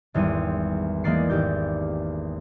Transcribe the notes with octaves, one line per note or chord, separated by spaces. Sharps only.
G#1 E2 G3 C6 D#7
E2 E3 G#3 A#3 D5 C7
G#1 A#3 G4 D6 G6